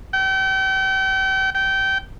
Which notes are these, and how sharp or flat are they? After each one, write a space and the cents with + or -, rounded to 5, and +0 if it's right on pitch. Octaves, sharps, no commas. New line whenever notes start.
G5 -35
G5 -20